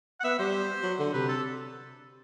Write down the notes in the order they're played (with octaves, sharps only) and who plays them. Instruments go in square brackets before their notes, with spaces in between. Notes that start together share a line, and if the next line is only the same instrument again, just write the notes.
[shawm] F#5
[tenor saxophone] B3 [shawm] E5
[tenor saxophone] G3 [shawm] C5
[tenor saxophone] F#3
D3
[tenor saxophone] C3 [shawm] B4
[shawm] A4